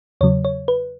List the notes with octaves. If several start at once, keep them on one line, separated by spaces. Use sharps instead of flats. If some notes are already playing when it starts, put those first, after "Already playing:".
E2 C#3 F#3 C#5
C#5
B4